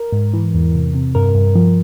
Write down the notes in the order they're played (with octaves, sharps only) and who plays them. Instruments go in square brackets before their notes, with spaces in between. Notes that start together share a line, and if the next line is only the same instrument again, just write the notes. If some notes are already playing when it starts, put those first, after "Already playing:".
Already playing: [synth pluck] A#4
G#2
E3
E2
C3
C3
G2 A#4
G2
F3